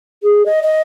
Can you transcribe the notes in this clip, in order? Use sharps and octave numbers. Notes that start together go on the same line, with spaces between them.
G#4
D#5
D#5